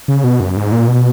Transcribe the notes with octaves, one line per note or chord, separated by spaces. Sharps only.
C#3
B2
F#2
G#2
A#2
B2